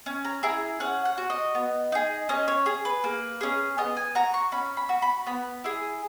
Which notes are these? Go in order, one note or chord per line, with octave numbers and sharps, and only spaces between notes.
C#4
A#5
E4 G#4 A#5
C#4 F#5
F#5
F#4
D#5
B3
D#4 G#4
C#4 D#5
C#5
G#4
B4
A#3
C#4 G#4
B3 D#5
G#5
F#4 A#5
C#6
C#4 B5
B5
F#4
B5
B3 B5
E4 G#4